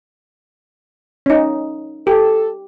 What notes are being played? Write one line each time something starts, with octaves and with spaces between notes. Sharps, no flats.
C#4 D#4
G4 A4